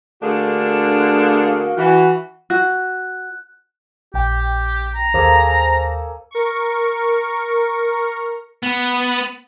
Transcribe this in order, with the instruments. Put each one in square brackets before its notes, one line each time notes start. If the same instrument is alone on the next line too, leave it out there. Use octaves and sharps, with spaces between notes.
[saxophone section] D3 A3 A#3 D4 F#4 G#4
E3 F#4
[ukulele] F#4 [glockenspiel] F#6
[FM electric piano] A#1 G5 [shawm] G4
[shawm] A#5
[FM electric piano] D#2 C5 [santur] A#3 G#4 A4
[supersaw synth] A#4 C#6
[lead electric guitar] B3